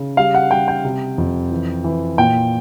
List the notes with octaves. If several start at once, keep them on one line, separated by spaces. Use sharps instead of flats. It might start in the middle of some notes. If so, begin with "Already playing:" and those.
Already playing: C#3
G3 F5
F#5
G3 G5
G5
C3
F2
E3
E3
A#2 G5